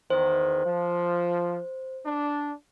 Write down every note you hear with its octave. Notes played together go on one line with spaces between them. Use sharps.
E2 D#3 C5
F3
D4